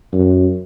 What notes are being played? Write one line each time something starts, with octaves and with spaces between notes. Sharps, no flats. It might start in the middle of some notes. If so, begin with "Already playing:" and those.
F#2